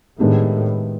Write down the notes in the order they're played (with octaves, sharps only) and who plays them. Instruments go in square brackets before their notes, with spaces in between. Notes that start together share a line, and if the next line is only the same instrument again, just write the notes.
[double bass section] A2 [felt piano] D#3 G#3 B3 D4 G4